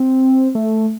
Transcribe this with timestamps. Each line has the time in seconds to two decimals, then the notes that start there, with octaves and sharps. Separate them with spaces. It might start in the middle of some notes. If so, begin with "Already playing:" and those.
Already playing: C4
0.55 A3